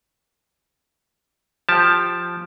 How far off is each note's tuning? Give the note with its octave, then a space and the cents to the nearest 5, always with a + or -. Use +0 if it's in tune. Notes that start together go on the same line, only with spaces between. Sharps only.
F3 +0 G4 +0 A5 +0